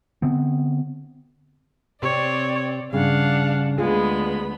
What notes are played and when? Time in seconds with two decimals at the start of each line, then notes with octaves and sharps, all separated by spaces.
0.22 D3 B3 C4
2.03 C3 C4 C#5 D5
2.93 G2 C#3 D4 F5 F#5
3.78 D2 G#3 B3 F4 G#4 B5